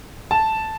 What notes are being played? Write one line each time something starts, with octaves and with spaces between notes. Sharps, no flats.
A5